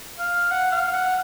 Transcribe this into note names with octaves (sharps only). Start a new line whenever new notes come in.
F5
F#5
F5
F#5